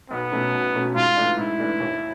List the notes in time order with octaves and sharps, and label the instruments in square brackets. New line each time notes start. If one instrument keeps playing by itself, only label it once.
[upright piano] B1 [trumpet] B3
[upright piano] B2 F#3 A3 C#4
B1
B2 F#3 A3 C#4
[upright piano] G#2 [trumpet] F4
[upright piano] E3 A3 D4
[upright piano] G#2 [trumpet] E4
[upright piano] E3 A3 D4
D#2